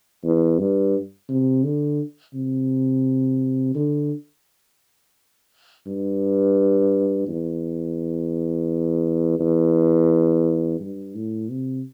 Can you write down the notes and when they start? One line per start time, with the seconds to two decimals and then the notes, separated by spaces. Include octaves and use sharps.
0.24 E2
0.59 G2
1.29 C3
1.64 D3
2.34 C3
3.75 D3
5.87 G2
7.28 E2
9.40 E2
10.80 G2
11.15 A2
11.50 C3